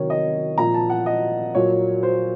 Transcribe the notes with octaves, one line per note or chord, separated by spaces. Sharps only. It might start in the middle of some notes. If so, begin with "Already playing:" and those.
Already playing: C3 D#3 F#3 C#5
D#5
A#2 F3 A#5
A5
F#5
D#5
A#2 F#3 C#5
C5